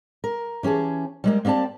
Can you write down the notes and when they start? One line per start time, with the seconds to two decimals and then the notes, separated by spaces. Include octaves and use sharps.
0.24 A#4
0.63 E3 C#4 G4 G#4 A5
1.24 G3 G#3 A#3
1.45 A#3 C4 G4 D5 A5